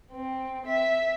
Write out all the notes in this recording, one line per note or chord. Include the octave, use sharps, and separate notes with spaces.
C4
E5